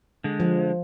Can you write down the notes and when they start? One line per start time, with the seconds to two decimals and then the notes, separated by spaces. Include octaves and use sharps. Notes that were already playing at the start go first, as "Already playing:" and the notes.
0.24 D3 G#3
0.40 F3